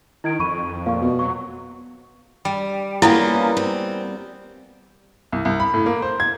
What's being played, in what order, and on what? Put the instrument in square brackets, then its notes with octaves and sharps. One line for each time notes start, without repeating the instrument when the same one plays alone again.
[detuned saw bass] D#3 [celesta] E4 G#6 D7
[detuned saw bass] F2 [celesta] B5 C#6 D#7
[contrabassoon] A#2 [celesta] F5 C#6
[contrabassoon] B2
[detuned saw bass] F#3 [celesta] C#6
[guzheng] G3
[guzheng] G3 B3 A#4 [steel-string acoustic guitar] A#3 C#4 F4 [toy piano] E4
[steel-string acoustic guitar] C4
[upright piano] C2
C2
B5
A2
A#3
C5
G#6